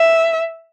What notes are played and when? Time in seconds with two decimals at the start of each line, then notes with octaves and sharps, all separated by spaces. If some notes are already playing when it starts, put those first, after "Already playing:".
Already playing: E5